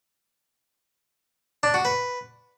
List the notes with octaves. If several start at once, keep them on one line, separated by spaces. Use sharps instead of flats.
D4
F#4
B4